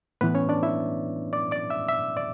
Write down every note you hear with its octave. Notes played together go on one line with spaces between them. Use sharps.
A2 E3 B3 B4
C#4 C#5
D4 D5
E4 E5
D5 D6
D5 D6
E5 E6
E5 E6
D5 D6